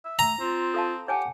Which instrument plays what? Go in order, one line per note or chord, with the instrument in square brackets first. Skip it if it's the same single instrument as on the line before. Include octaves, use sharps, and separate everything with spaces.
[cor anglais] E5
[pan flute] A3 [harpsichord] A#5
[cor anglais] C4 [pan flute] F4
[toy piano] A4 F5 A5
[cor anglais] G4 [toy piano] C#5 G#5 A5 [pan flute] F#5